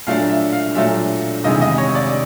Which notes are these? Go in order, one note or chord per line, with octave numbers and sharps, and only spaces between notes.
A#2 F#3 A3 D4 F5
E5
F5
A#2 F#3 A3 D4 E5
F1 E2 C3 D#3 G#3 D#5
D#5
C#5
D5